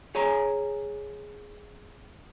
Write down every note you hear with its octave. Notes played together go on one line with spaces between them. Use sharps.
G#4 C#5 G#5 A#5